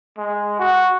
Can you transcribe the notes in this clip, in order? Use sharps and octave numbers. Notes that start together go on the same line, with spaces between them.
G#3
F#4